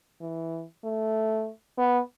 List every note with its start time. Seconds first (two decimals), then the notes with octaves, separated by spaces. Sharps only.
0.21 E3
0.84 A3
1.78 B3